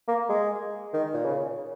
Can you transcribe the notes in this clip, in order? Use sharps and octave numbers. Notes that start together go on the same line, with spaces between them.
A#3
G#3
D#3
A#2
C#3